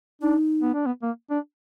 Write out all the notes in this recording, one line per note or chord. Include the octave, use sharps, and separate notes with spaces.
D4 D#4
B3
D4
B3
A#3
D4